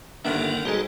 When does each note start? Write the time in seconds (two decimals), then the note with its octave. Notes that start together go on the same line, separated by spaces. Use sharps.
0.25 G1 D3 D#3 A#3 B3 D4 E5
0.65 B1 G#2 G3 G#3 F#4 A4